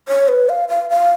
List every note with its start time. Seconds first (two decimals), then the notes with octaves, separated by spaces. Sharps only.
0.08 C#5
0.28 B4
0.49 F5
0.69 F5
0.90 F5